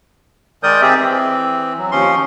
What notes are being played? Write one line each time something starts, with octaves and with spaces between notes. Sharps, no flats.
D#3 G#3 A#4 D5 D#6 G6
C4 G4 G#4 E5
E3 C4
F#3
D#2 F3 C#4 C6